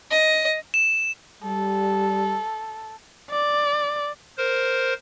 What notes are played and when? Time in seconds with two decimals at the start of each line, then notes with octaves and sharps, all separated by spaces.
0.11 D#5
0.74 E7
1.43 G3 A4
3.31 D5
4.38 A#4 C5